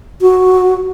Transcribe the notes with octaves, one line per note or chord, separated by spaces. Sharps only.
F#4